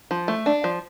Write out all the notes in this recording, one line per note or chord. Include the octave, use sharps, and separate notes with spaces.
F3
A3
D4
F3